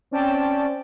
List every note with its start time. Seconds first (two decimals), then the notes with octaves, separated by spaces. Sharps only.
0.11 C4 C#4 D5 G5 A5